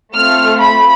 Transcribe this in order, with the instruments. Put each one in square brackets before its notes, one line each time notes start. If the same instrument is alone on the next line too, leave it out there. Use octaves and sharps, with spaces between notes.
[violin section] A3 C4 F4 F6
B5